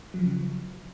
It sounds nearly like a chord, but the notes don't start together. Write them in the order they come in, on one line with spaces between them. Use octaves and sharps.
F#3 F3 C#3